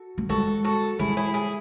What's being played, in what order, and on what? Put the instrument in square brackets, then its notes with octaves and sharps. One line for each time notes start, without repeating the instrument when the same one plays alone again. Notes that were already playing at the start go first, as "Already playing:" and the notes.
Already playing: [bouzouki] F#4 A4
[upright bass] A3
[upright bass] G#3 [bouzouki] F#4 A4
[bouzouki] F#4 A4
[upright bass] G#3 [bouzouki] E4 G#4
[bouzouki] E4 G#4
E4 G#4